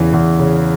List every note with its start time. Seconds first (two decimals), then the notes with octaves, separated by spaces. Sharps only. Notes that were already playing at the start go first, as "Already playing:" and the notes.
Already playing: E2 C#3 E3
0.13 E2
0.39 C#3